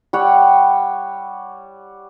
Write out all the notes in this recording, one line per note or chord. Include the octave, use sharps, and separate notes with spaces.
G3 C#5 F#5